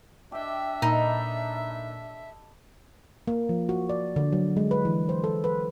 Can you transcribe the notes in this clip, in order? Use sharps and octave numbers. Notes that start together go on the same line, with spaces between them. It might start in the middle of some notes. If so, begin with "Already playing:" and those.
D4 G4 E5 G5
A#2 D#4 A4 D#5 B5
A#3
F3
F#4
D5
D3
F#3
G#3
B4
E3
C5
A4
B4